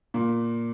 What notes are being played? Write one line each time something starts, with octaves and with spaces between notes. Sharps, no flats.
A#2 A#3